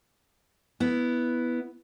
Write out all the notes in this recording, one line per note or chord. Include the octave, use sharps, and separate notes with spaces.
B3 E4